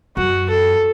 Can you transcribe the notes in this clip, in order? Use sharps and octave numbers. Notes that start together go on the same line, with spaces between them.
F#2 F#4
A4